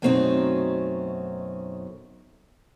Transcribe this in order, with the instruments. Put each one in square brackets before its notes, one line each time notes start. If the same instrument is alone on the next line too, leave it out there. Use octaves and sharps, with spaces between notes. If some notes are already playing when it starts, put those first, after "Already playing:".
[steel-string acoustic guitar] F#2 B2 A3 C4 C#4 D#4